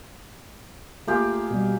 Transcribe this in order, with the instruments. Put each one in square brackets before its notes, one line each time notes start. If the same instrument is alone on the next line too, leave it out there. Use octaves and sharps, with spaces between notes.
[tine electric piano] A3 F4 [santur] A#3 G4 G#4
[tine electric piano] B2 G3